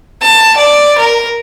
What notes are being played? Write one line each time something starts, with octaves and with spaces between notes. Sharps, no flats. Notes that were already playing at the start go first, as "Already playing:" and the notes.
A5
D5
A#4